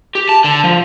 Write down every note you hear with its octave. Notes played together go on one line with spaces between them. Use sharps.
G4
A5
D3
F3